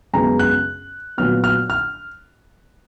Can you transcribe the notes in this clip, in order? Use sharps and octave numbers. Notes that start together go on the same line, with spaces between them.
F#2 C#3 G#3 B3 A#5
F#6
A#2 F#3 B3 F6
F6
F6